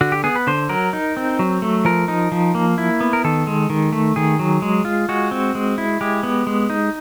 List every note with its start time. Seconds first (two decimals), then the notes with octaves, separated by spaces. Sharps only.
0.01 D3 F#4
0.12 G4
0.24 B3 G#4
0.36 B4
0.47 D3 C5
0.69 F#3 A#4
0.93 D#4
1.17 C4
1.39 F#3
1.62 A3
1.85 F3 A#4
2.08 D#4
2.32 F3
2.55 A#3
2.78 E4
3.01 B3
3.13 A#4
3.24 D#3 A4
3.47 G#3
3.70 D#3
3.93 A3
4.16 D#3 G#4
4.39 F#3
4.62 G#3
4.85 F4
5.09 G#3 F#4
5.31 C4
5.55 G#3
5.78 E4
6.01 G#3 G4
6.23 B3
6.47 G#3
6.70 D#4